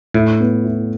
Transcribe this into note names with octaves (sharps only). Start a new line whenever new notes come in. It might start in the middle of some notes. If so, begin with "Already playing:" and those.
A2 E4
B3
E4